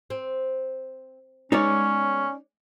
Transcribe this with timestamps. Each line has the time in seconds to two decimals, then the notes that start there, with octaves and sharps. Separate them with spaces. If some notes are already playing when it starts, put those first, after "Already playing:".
0.10 C4
1.52 G#3 B3 C#4 D#4 C#5 D5